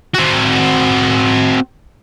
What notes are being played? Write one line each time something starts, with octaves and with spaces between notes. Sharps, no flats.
C4 F#4